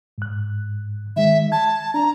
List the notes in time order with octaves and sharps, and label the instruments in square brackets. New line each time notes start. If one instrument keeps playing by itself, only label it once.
[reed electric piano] G#2 F#6
[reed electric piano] D#3 G#3 [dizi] E5
[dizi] A5 [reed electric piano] G#6
[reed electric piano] D4 [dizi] A#5